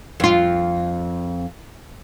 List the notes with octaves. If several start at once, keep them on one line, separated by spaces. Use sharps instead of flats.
F2 F4